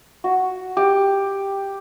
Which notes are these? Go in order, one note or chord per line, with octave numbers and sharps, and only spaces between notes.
F#4
G4